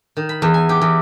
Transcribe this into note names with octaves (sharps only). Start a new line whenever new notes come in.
D#3
B5
E2
G#5
G4
E2